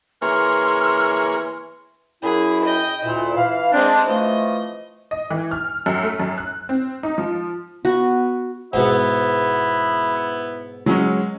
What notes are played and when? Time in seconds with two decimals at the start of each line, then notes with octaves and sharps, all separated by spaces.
0.22 E3 A#3 G#4 C#5 C6 F6
2.22 F#2 E4 G#4
2.64 D#5 G5
3.04 D2 A#2 E4
3.36 E3 F5
3.72 G#3 C4 D4
4.07 E3 F3 A3 D#5
5.11 D#5
5.30 E3
5.51 F6
5.86 F#2
6.03 A3
6.20 F#2
6.38 F#6
6.69 C4
7.03 D#4
7.18 F3
7.85 B3 F#4
8.73 G#2 B2 B3 E4
10.86 F#3 G#3 C#4